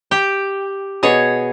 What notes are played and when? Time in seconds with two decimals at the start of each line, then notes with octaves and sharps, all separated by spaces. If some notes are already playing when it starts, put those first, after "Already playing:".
0.11 G4 G5
1.03 B2 G#4 C#5